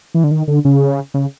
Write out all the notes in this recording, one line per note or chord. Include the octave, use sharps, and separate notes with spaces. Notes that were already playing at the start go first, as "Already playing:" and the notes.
E3
D3
D#3
D3
C#3
C#3